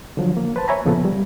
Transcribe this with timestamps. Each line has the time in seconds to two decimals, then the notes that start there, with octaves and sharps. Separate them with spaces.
0.17 D3 F3 F#3
0.37 A#3
0.56 B4 C5 A5
0.68 C#5 E5 G#5 A#5 B5
0.85 C#2 A#2 C#3 F3 B3 A4
1.05 G3